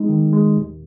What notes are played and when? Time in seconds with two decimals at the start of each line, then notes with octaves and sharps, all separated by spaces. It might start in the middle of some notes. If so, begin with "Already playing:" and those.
Already playing: G#3 D#4
0.09 D#3
0.33 G#3
0.57 D#2